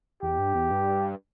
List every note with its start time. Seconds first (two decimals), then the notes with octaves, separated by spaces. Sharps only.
0.22 E2 G4
0.38 G2
0.55 E2
0.71 G2